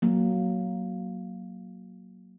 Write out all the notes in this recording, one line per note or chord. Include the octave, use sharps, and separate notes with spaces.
F#3 A#3